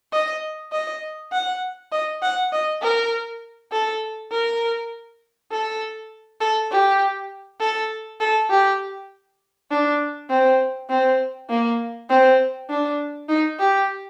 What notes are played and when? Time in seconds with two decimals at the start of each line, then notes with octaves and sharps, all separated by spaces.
0.13 D#5
0.72 D#5
1.33 F#5
1.92 D#5
2.22 F#5
2.53 D#5
2.82 A#4
3.72 A4
4.32 A#4
5.52 A4
6.41 A4
6.72 G4
7.61 A4
8.20 A4
8.50 G4
9.71 D4
10.30 C4
10.90 C4
11.49 A#3
12.10 C4
12.70 D4
13.29 D#4
13.59 G4